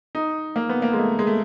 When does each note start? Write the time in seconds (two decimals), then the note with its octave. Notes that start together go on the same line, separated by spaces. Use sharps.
0.15 D#4
0.56 A#3
0.69 B3
0.82 A#3
0.93 G#3
0.98 A3
1.19 G#3
1.27 A3